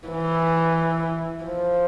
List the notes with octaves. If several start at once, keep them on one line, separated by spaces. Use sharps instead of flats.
E3
F3